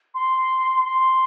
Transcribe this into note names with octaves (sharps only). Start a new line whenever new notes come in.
C6
C6